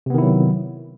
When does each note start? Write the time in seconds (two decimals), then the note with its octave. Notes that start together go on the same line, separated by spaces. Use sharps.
0.06 C3
0.10 B3
0.14 D#3
0.18 E4
0.22 F#3